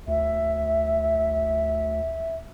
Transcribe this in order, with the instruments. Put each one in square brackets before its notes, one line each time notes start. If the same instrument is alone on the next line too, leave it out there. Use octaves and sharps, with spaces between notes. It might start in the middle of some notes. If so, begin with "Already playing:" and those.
[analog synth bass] D2 [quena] E5